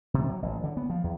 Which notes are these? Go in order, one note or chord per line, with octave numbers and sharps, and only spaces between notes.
C3
F#3
A1
D3
B3
F3
E2